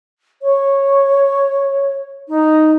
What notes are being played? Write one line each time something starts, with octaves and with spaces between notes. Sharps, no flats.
C#5
D#4